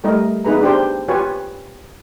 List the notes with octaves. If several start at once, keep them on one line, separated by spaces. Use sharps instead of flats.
G3 A3 E4 A#4 D#5
B3 D#4 E4 G#4 B4 A#5
D4 G4 C5
F4 G4 B4 C#5 G#5